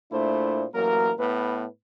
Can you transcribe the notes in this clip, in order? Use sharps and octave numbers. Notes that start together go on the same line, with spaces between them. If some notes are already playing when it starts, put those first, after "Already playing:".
A#2 A3 D4 E4 C5
A1 F#3 A#3 A#4
A2 B3 B4